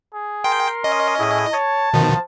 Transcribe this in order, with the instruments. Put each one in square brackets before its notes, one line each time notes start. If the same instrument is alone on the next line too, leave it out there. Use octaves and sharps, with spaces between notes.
[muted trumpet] G#4
[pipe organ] A#4 C6 [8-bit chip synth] G5
[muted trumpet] C#4 [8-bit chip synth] D#5
[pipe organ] A2 E4 G#4
[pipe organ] C#5 [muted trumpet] A5
[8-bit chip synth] B2 D#3 [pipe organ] F3